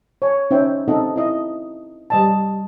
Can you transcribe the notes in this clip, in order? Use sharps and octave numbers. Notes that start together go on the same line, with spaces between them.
C#5 G#5
C#4 D#4 C5 E5 G5
C4 D#4 A4 D#5 F#5
E4 D#5
G3 D#5 A5